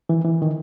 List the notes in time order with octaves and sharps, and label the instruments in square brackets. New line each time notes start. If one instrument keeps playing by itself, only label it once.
[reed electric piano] E3
E3
D#3